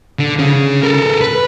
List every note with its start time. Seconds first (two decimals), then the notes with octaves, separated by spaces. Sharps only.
0.19 D3
0.39 C#3 C#4
0.83 A4 A#4
1.21 B4